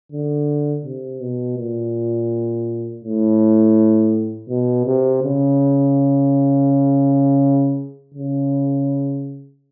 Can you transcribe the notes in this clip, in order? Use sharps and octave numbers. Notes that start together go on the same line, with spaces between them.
D3
C3
B2
A#2
A2
B2
C3
C#3
C#3